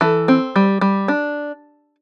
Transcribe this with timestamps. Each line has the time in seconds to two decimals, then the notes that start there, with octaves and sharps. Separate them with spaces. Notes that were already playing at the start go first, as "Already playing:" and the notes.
0.01 E3 A4
0.28 C4
0.56 G3
0.81 G3
1.08 D4